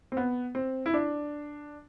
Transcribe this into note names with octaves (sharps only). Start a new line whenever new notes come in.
C4
B3
C4
E4
D4